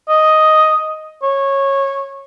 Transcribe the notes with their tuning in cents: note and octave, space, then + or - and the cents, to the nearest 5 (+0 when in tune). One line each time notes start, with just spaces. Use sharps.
D#5 +5
C#5 -15